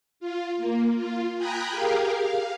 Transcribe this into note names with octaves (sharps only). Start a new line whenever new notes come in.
F4
A#3
F4
G5 G#5 A#5 B5 D#6 F#6
G4 G#4 A#4 F5
F5